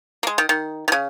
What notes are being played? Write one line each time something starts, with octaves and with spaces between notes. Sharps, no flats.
A#3
G#3
D#3
D#3
D#3
C#3